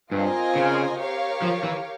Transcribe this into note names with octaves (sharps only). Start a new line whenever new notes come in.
G2 C4 F4 A#4 D#5 G#5
C#3
G4 A#4 C#5 F5
F3
E3